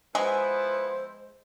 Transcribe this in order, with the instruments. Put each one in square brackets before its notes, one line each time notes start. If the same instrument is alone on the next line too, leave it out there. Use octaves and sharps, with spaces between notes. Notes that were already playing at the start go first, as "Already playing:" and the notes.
[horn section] F3 B3 E4 [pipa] G#3 [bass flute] C5